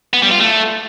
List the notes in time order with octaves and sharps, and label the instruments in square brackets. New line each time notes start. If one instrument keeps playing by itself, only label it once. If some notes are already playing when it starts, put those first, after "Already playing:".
[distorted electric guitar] B3
G3
F4
A3